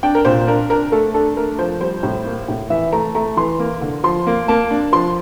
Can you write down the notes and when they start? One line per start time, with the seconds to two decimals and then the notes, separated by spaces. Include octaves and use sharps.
0.03 D4 G5
0.15 A#4
0.25 A#2 C5
0.47 D4 A#4
0.70 D4 A#4
0.92 A3 A4
1.14 D4 A4
1.36 A3 A#4
1.59 F3 C5
1.81 G3 C5
2.03 A2
2.26 A#3
2.48 A2
2.70 E3 E5
2.92 A3 A#5
3.15 A3 A#5
3.37 E3 C6
3.60 A#3
3.81 D3
4.04 F3 C6
4.27 A#3
4.48 A#3 A5
4.71 D4
4.92 F3 C6